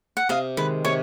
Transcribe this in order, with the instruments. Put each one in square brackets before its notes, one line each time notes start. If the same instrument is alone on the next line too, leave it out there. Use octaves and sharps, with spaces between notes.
[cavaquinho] F#5
[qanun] C3 [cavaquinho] D#5 F5
[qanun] D#3 G#3 [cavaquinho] B4
[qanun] C3 [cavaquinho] C#5